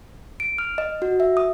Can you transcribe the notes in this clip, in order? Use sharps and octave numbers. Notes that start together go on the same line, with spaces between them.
D7
F6
D#5
F#4
E5
D#6